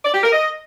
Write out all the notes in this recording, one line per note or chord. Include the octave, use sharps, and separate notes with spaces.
D5
G4
A#4
D#5